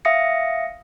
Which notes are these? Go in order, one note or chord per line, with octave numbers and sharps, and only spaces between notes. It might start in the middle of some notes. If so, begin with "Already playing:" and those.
E5 F5 D#6 A#6 C#7